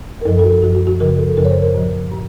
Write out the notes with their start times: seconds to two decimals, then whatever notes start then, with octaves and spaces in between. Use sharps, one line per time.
0.21 A#4
0.25 F#2 F3 A4
0.39 A4
0.44 F#4
0.62 F#2 F3 F#4
0.75 F#4
0.87 F#4
1.00 F#2 C#3 F3 A#4
1.18 A4
1.37 F#2 C#3 F3 A#4
1.45 C#5
1.50 C5
1.62 A#4
1.75 A2 F3
2.12 A2